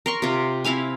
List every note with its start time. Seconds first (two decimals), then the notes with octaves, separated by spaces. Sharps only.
0.06 A#4 C6 C#6
0.22 C3 F4
0.64 C4 E4 F5 G#5